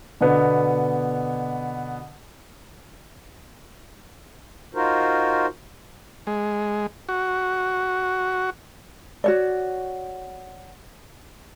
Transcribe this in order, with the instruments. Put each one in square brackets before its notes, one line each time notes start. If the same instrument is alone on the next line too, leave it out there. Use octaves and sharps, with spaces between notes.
[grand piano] B2 D3 B3
[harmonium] D#4 F4 F#4 A#4 C5
[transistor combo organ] G#3
F#4
[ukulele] F#4 C#5 D5